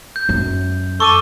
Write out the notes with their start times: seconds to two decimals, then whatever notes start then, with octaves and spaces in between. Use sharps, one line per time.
0.16 G6
0.29 F#2
1.00 A4 C#6 D6 D#7